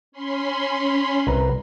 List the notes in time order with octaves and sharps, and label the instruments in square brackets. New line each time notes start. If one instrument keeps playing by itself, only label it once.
[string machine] C#4 B5 C6
[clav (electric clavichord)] C2 B4 A#5